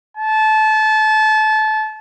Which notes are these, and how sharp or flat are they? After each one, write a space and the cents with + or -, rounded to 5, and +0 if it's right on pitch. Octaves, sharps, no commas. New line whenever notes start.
A5 -25